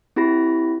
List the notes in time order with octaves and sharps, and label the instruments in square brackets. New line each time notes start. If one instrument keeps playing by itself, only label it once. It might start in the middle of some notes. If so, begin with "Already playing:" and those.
[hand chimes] C4 E4 G4 B5 A#6